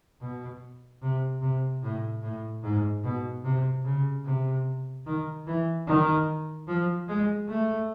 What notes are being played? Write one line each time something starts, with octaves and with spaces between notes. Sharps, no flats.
B2
C3
C3
A2
A2
G#2
B2
C3
C#3
C3
D#3
E3
D#3
F3
G#3
A3